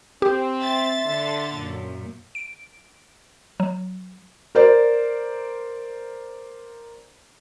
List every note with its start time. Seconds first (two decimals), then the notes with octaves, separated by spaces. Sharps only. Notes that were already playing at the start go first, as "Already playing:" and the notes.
0.22 C4 G4
0.58 E5 C6 A6
1.06 D3
1.54 F#2 A#2
2.35 D7
3.60 F#3
4.55 A#4 C5 D5